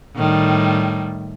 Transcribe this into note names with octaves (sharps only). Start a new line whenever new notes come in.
A2 D#3 G3